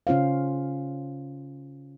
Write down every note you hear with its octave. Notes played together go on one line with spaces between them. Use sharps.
C#3 C#4 F4 C5 F5